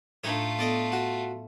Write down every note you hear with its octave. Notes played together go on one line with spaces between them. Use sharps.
A2 A3 D4 D#4 F4 C#5
B3 A4 D5 D#5
F#4